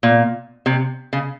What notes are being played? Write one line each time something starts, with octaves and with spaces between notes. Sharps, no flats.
A#2
C3
C#3